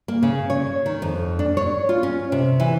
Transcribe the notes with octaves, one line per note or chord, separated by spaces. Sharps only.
A#3
C#3
C#5
D#3
F2
D4
C#5
F4
C#4
C3
E3